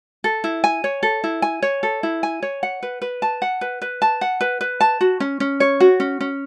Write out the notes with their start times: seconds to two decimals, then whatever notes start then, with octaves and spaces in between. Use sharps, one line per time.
0.24 A4
0.44 E4
0.64 G#5
0.84 C#5
1.03 A4
1.24 E4
1.42 G#5
1.62 C#5
1.83 A4
2.03 E4
2.23 G#5
2.43 C#5
2.63 F#5
2.83 B4
3.02 B4
3.22 A5
3.42 F#5
3.61 B4
3.82 B4
4.02 A5
4.21 F#5
4.41 B4
4.61 B4
4.80 A5
5.01 F#4
5.20 C#4
5.40 C#4
5.60 C#5
5.80 F#4
6.00 C#4
6.20 C#4